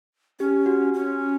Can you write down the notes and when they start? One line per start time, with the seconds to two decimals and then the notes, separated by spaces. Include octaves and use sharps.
0.40 C#4 G4
0.66 F#4
0.94 C#4